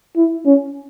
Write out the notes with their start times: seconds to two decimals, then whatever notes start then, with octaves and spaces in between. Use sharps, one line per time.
0.16 E4
0.46 C#4